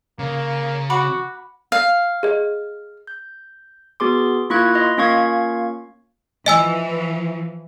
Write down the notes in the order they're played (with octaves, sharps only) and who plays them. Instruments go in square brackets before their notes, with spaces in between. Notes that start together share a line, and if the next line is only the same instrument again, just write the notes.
[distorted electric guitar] C#3 [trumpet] A#3
[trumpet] F#4 [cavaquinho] F#5 B5 D6
[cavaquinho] F5
[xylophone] G#4 D#5
[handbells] G6
B3 F#4 G#4 C6 D6
A#3 E4 F4 C#6 F#6 G#6
D#5 C6
A#3 C#4 F4 F5 C#6 G#6
[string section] E3 F3 [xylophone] D#5 G#5 E6